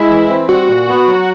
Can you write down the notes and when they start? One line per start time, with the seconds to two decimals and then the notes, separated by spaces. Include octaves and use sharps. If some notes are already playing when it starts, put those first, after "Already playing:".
Already playing: G#3 E4
0.10 E3
0.30 C4
0.49 G3 F#4
0.68 A#2
0.88 B3
1.07 F#3